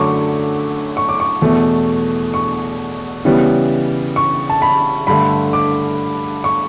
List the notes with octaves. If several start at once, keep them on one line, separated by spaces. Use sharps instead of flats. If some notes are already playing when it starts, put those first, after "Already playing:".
Already playing: F#2 D3 F#3 A3 C#6 D6
C#6
D6
C#6
E2 B2 A3
C#6
C#3 E3 G3 B3
C#6
A5
B5
G2 D3 A3 B5
D6
C#6